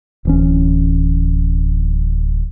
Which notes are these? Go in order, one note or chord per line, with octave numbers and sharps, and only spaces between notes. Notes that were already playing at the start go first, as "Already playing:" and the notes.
D1 E3 C#4